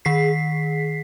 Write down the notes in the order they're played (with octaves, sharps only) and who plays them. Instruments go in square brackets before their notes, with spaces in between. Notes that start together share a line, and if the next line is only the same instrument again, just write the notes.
[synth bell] D#3 G#4 B6 C7